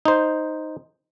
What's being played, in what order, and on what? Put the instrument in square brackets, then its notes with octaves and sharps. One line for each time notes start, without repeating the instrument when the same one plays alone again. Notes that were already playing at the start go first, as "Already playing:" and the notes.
[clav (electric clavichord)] D#4 C5